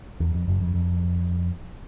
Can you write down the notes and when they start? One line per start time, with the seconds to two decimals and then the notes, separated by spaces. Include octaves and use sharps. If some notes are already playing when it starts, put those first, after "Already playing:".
0.20 E2
0.34 F2
0.48 F#1 F#2
0.61 F2
0.74 F2